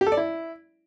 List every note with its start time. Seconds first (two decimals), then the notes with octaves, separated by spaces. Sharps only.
0.01 G4
0.06 A4
0.12 D5
0.17 E4